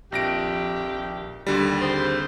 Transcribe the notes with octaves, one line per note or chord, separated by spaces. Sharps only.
A#1 F2 D#3 G4 A#6 D7
D#2 D3 G3
C3 G#4 C5